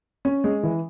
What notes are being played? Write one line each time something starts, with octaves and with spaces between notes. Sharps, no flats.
C#4
G#3
E3